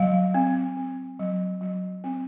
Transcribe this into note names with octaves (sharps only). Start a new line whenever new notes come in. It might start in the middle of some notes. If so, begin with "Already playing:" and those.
Already playing: F#3 F5
C4
C4
F#3
F#3
C4